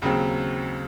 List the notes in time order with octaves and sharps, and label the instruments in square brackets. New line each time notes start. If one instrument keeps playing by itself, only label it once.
[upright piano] D#2 C#3 F#3 C4